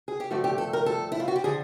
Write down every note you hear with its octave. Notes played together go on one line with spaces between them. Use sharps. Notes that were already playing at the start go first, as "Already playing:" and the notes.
G#4
G4
G2 D3 F3 A3 F#4
G4
A4
A#4
A4
E4
F4
F#4
G4
D3 F3 G#4